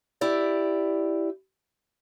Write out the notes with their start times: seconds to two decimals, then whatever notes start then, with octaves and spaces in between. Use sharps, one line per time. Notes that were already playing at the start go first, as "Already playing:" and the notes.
0.21 E4 G4 D5